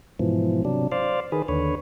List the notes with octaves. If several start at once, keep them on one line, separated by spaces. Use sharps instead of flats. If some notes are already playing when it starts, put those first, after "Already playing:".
G#2 B2 E3 F3
C3 F#3 D4
C5 D5 F5
D#3 G#4 B4
D#2 D3 B4 C#5